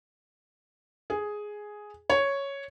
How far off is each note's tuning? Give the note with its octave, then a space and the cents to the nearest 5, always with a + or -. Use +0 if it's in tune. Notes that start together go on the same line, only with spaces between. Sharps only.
G#4 +5
C#5 +0